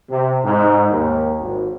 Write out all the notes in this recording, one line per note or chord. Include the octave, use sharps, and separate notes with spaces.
C3
G#2
D#2
G#1